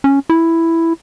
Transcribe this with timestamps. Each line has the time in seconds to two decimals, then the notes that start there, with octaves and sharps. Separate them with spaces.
0.04 C#4
0.30 E4